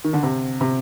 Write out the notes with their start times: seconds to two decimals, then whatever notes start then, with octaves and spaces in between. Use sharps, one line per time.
0.04 D#3
0.13 D3
0.23 C3
0.61 C3